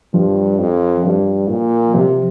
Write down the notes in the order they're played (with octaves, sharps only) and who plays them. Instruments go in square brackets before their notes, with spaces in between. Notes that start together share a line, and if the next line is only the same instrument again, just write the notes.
[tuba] G2 [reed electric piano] F3
[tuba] F2
[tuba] G2 [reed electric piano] F3
[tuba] A#2
[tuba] C3 [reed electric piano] F3